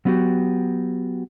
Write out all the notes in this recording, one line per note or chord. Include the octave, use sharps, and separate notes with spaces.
F#3 B3 C#4 E4 F#4 G4